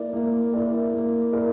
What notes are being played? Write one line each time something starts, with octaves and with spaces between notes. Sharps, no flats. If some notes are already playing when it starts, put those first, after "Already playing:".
Already playing: A#3 E4 A#4 D5
A#3
E4 A#4 D5
A#3
E4 A#4 D5